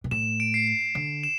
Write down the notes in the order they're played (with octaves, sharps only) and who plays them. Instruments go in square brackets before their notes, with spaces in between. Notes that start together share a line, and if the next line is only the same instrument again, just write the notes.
[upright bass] B2
[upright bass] A2 [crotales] E7
[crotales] D7
C7
C7
[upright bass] D3
[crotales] E7